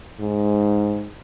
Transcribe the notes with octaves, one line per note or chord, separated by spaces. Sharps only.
G#2